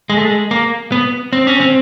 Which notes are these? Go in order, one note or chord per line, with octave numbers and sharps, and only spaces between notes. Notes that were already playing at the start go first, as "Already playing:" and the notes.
G#3
A3
G#3
A#3
B3
C4
C#4
C4